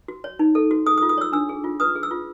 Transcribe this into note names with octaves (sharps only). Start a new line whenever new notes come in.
F#4
C#5
D#4
A4
F#4
G#4 D#6
D#6
F4
D#6
C#5 E6
D4 E6
G#4
F4
B4 D#6
G#4
E6
F4